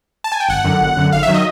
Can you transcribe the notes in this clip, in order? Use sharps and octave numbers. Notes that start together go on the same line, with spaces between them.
A5
G#5
G5
G1 F#5
F#2 D3
G1
F#2 D3
G#1 F5
E5
D#3 F#3
D#5